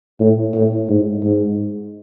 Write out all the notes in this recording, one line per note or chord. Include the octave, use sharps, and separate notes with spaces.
A2
A2
G#2
G#2